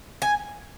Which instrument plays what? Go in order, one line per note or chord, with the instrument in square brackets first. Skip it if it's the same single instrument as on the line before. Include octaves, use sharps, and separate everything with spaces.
[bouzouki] G#5